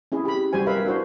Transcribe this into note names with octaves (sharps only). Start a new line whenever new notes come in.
C#4 E4 G#4
G4 B5
G3 F#4 C5 G#5
A#4 B4 E5 F5 B5
D4 E4 F#4 C5